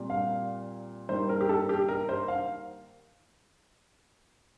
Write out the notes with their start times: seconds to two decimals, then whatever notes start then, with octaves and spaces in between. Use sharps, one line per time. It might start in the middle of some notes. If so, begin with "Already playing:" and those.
Already playing: A#2 G3 C4
0.10 F5
1.09 D#3 G3 A#3 C5
1.29 A#4
1.41 G4
1.49 A4
1.69 G4
1.88 A#4
2.09 C5
2.28 F5